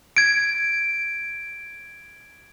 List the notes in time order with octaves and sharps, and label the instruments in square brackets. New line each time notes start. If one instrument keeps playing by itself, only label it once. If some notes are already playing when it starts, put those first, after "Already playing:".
[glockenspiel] G#6 D7